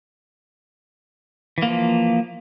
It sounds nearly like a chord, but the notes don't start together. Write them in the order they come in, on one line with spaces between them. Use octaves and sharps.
E3 A#3 F3